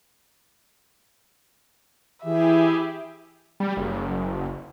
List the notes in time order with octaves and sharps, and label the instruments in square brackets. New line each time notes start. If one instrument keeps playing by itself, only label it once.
[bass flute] E3 [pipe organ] E4 G4 G#4 [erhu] E5
[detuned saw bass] G3
F#1